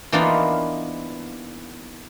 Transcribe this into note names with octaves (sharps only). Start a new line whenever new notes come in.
E3 A#3 B3 D4 D#4 F4